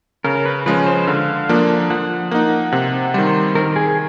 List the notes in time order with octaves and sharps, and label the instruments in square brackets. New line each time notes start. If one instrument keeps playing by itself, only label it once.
[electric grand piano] C#3 [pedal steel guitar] A#4
[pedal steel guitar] B4
[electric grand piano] F3 G#3 C#4 [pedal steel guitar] B4
[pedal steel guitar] C5
[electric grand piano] D3 [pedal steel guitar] F5
[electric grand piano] F3 A#3 D4
[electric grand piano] F3 [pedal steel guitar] F#5
[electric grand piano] A#3 D#4 [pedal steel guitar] F#5
[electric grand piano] C3 [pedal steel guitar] F#5
[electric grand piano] D#3 G3 [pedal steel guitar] C5
[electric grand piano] D#3 [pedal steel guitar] A#4
[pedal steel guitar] G#4